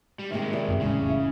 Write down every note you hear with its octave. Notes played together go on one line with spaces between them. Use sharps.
G3
C3 D#3 G#3 A#3 E4
C3 E4 D5
F#2 B3 C4
F1 E2 A2 C#3 G#3
E4